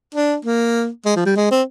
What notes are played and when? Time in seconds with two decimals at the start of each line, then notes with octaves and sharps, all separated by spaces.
0.15 D4
0.45 A#3
1.06 G#3
1.16 F3
1.26 G3
1.36 G#3
1.51 C4